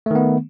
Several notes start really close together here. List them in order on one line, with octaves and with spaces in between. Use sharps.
A3 D#3 B3